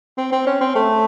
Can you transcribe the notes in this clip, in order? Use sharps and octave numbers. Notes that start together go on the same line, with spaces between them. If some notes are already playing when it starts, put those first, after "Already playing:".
C4
C4
C#4
C4
A3